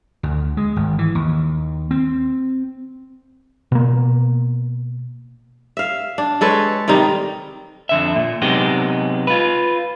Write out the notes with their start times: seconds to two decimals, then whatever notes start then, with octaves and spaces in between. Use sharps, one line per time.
0.23 D2
0.57 G#3
0.76 G#1
0.99 E3
1.15 D#2
1.91 C4
3.72 B2 A#3
5.77 E5 F5
6.18 D4
6.41 G#3 A4 B4 C#5
6.88 C3 D#3 G3 D#4
7.89 F2 D3 E5
8.16 A#2
8.42 C3 F#3 G#3 B3 D#4 G4
9.27 F4 B4